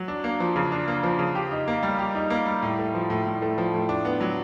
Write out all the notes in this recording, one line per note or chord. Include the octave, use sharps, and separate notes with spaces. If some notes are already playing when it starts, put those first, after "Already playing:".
Already playing: F#3
D4
A#3
F3
C#3
D4
A#3
F3
C#3
G4
D#4
A#3
G3
G4
D#4
A#3
G3
A2
A3
F3
A2
A2
A3
F3
A2
D4
B3
F#3